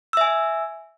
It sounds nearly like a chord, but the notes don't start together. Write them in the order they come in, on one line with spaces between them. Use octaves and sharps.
E6 E5 G#5